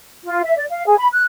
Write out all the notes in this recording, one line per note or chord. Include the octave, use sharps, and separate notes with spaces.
F4
E5
D5
F5
G#4
B5
F#6